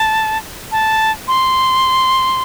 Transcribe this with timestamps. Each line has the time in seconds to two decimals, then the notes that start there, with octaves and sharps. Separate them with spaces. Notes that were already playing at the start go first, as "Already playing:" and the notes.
Already playing: A5
0.72 A5
1.28 C6